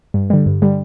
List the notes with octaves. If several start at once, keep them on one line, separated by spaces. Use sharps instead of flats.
G2
D3 G3
G2
D3 G3